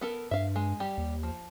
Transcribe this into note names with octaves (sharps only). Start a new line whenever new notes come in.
B3 A4 A#4
G2 E5 F5
G#3
G3 G4
D#2
F3